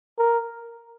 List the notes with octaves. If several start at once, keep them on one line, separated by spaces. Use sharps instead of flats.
A#4